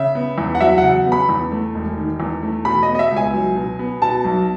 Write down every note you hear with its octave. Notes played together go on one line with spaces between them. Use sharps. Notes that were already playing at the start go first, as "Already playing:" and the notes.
Already playing: C#3 E5
B3
E2
F#5
F#3 E5
F#5
C#3
B3
B5
E2
A3
E1
D#3
E2
A3
B2 B5
D#5
B3
D#5
E5
C#2
G#5
F#3
B2
B3
B2 A5
B1